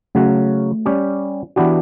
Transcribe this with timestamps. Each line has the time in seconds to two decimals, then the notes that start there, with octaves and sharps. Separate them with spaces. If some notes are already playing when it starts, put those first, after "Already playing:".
0.15 C#3 F#3 A3 C#4 F#4
0.86 G3 C#4 G4
1.56 E3 B3 D4 F#4 G4